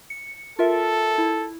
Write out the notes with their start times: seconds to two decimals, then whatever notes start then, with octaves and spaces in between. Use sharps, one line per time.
0.10 C#7
0.59 F4 A4 A#4 E5
1.18 E4